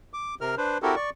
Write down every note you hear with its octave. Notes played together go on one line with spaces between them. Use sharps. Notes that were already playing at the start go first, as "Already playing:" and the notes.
D6
C3 A#4 F6
D4 B4 C5
C4 E4 F#4 G4 A4 A#4
D5 C#6